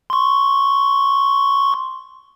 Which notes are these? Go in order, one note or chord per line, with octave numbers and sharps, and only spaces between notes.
C6 C#6